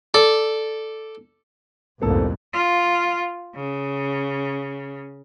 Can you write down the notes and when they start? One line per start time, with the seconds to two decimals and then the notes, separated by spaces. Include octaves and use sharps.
0.14 A4 D5
2.02 C2 F2 G#2 A#3 B3 A4
2.53 F4
3.55 C#3